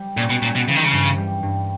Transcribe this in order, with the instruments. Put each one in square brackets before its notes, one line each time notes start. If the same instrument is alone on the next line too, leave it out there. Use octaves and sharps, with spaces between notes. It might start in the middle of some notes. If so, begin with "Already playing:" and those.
Already playing: [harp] G3
[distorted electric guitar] A#2 [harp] C#4
[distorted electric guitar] B2
[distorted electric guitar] A#2 [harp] G#3
[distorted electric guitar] B2
[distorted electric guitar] C#3 [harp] E3
[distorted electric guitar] D#3
C#3
[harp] G2
G3
G2